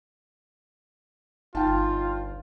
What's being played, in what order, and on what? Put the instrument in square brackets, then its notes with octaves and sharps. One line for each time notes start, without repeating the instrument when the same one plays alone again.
[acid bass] G1 [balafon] D#4 [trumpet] F4 [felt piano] G5 A5